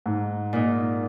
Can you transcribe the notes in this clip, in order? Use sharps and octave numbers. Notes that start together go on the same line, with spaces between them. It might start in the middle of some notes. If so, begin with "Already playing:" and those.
G#2
A#2 D#4